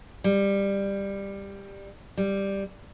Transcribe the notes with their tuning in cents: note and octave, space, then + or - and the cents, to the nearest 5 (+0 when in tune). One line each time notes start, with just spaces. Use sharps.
G3 +15
G3 +5